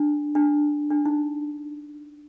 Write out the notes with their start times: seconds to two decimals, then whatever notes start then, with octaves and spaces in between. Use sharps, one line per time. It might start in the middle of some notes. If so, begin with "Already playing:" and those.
Already playing: D4
0.35 D4
0.91 D4
1.05 D#4